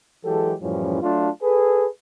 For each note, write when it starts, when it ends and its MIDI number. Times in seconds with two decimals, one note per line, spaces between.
0.25 0.53 52
0.25 0.53 54
0.25 0.53 56
0.25 0.53 67
0.25 0.53 69
0.62 1.02 42
0.62 1.02 45
0.62 1.02 52
0.62 1.02 53
0.62 1.02 55
0.62 1.02 61
1.02 1.29 54
1.02 1.29 57
1.02 1.29 62
1.02 1.29 65
1.43 1.86 68
1.43 1.86 69
1.43 1.86 71